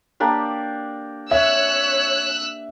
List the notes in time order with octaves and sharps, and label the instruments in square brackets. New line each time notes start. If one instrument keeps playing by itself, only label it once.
[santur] A#3 D4 G4
[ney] C#5 [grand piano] E5 [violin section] E6 F#6